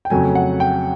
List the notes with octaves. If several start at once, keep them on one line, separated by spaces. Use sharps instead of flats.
G5
F2 C#3 F#3 A3 G#5
F#5
G5